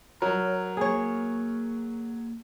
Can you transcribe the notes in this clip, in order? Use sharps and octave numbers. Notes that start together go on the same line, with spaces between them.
F#3 A#4 C#5
A#3 G#4 C#5